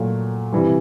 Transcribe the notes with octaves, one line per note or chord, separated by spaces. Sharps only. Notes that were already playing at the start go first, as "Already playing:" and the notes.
Already playing: A#2 F#3 A3
C3 E3 G3